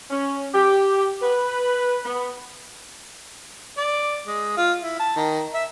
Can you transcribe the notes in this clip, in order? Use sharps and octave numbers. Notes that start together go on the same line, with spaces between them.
C#4
G4
B4
B3
D5
G#3
F4
E4
A5
D#3
E5